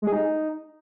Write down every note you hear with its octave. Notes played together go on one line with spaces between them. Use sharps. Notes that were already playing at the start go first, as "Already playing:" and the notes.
G#3
G#4
D#4